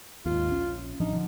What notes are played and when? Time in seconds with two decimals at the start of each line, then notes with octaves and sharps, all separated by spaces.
0.26 D#2 G#2 F4
0.48 A#1 C#4
1.00 A1 F3 D4 D#4
1.13 D3 F3